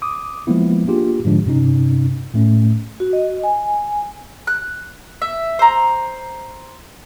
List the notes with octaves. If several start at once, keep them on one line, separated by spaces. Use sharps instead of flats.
D6 D#6
F3 G#3 A#3 B3 E4
A#3 D4 F4 G4 G#4
G#2 D3 F3 G#3 D4
G2 C3 C#4 D#4
A2 A3 C#4
F#4
D#5
G#5
F#6
E5
C5 A#5